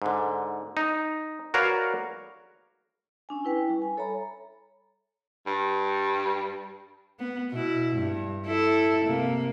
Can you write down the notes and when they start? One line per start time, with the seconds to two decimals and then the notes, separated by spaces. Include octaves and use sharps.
0.02 G#2 D3
0.77 D#4
1.54 F#4 A#4 B4 C#5 D5 F5
3.29 C#4 D4 G#5
3.45 E4 B4 G5
3.69 G3
3.82 G#5
3.97 A4 C#5 E5 A#5 B5
5.47 G2
7.19 B3
7.51 B2 E4
7.95 G2
8.46 E4 A4
9.05 C3 A#3